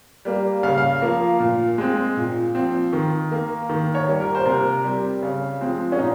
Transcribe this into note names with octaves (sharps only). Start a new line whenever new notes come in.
G3 A#3
C#3 F5
F5
F3 A#3
A#2
G#3 C4
A#2
F3 C4
D#3
A#3
D#3
C#5
G3 A#3
A#4
C5
C3 A#4
G3 C4
C#3
F3 G#3 C4
C#4
A#2 D#4